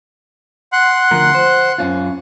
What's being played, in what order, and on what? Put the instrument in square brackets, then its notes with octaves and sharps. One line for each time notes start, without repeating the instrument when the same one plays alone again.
[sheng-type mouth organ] F#5 C6 F#6
[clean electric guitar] D2 F3 A#4
C5
F#2 C#4 F4